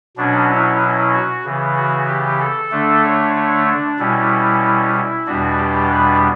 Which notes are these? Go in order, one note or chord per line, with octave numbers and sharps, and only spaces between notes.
B2 F#3 C#4 D4
E4
E4
F#4
C#3 E3 B3
F#4
G4
A4
D3 A3 D4
C#5
C#5
D4
B2 G3 C#4 E4
E4
E2 B2 G3 B3 D4 F#4
G4
B4